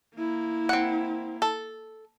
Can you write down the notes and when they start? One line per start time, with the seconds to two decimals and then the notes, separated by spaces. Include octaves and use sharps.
0.16 A#3 E4
0.69 C4 F#5
1.42 A4